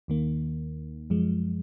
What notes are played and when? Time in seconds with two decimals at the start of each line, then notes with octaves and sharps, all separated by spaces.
0.08 D#2 D#3 A#3
1.10 F#2 F3 G#3